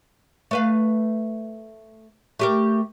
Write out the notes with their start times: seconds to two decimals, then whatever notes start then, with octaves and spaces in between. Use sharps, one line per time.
0.51 A3 B4 F5
2.39 A3 G4 A#4